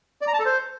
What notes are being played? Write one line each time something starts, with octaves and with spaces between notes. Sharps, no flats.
D5
A#5
A5
A4
C5